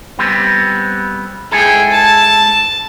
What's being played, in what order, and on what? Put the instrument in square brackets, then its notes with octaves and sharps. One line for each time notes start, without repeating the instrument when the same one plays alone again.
[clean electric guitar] G3 B3 C4
[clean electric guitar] G#2 E4 A4 [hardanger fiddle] G#4 G5
[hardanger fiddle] A5